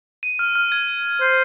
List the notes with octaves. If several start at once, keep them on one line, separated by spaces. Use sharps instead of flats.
D#7
F6
F6
G#6
C5